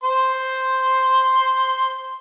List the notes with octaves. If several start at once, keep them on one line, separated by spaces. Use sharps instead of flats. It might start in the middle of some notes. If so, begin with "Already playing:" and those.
C5 C6